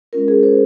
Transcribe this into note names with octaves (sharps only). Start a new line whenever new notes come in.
G#3 C#4 F4 A#4
G#4
C5